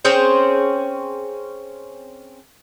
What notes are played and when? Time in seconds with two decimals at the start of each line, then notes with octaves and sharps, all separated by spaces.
0.05 C4 C#4 G#4 C5